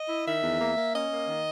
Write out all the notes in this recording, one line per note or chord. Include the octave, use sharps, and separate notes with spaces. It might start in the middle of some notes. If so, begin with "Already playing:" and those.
Already playing: D#5
E4
D#3 E5
E2
A#3
A#3
C#4 D#5
A#3
D#3